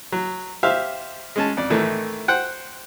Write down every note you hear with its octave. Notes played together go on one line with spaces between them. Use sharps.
F#3
G4 C5 E5 F5
G#3 C#4 A5
F2 D5
A2 D#3 E3 A3
C5 F#5 G5